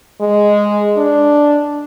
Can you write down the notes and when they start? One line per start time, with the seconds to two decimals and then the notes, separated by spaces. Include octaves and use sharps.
0.21 G#3
0.97 D4